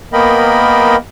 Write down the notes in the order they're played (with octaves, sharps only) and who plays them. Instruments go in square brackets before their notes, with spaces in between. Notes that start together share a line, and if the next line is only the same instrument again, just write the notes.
[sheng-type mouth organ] A#3 B3 A#4 D#5 G5 B5